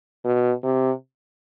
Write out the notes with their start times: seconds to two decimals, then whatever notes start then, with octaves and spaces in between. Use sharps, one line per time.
0.25 B2
0.64 C3